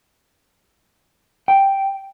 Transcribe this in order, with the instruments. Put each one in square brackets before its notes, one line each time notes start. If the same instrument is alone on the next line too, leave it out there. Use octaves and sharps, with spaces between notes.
[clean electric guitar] G5